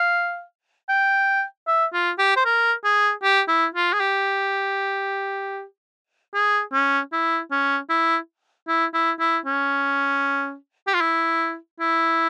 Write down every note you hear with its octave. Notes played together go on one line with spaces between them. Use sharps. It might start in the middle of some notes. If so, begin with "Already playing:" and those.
Already playing: F5
G5
E5
F4
G4
C5
A#4
G#4
G4
E4
F4
G#4
G4
G#4
C#4
E4
C#4
E4
E4
E4
E4
C#4
G4
F4
E4
E4